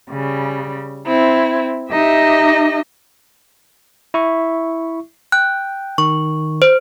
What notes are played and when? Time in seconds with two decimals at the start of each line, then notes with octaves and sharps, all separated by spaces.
0.11 C#3 G3
1.05 C4 E4
1.91 D#4 G4 D#5 E5
4.14 E4 E5 C#6
5.32 G5 F#6
5.98 D#3 C#6
6.62 C5